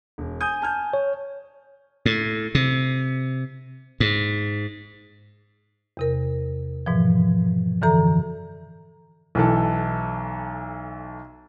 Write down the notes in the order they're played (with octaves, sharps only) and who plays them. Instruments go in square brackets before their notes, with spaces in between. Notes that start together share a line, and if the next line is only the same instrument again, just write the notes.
[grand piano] E1
[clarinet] G#5 [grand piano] D#6 G6 D#7
[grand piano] A5 F6 G6
[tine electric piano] C#5
[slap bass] A2
C3
G#2
[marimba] E2 C3 A#4
G#2 B2 E3 F3
F#2 D3 E3 A4 A#5
[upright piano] B1 E3 A4